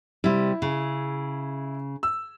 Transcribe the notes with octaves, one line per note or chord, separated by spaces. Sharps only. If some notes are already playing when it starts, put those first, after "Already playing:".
C3 G3 E4
C#3
E6